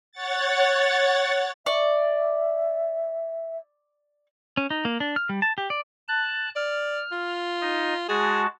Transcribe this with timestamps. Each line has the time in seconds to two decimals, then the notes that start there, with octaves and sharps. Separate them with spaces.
0.12 C#5 F#5 A6
1.66 D5 E5 C#6
4.57 C#4
4.70 D#4
4.85 A#3
5.00 D4
5.16 F6
5.29 G3
5.42 A5
5.58 G4
5.70 D5
6.08 A5 F#6
6.56 D5 F6
7.12 F4
7.61 D#4 D#5
8.09 G#3 F#4 G#4 A5